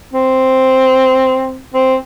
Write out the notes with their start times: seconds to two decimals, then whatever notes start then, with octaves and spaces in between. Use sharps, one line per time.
0.13 C4
1.74 C4